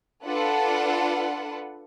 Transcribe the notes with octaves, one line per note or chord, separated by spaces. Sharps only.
D4 F4 A4 B4 F#5